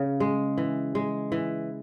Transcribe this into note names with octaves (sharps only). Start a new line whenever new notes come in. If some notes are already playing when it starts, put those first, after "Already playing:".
Already playing: C#3
G#3
E3
G#3
E3